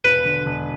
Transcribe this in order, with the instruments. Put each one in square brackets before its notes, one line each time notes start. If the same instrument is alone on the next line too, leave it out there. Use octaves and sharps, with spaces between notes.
[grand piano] E1 [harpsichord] B4
[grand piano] D3
E1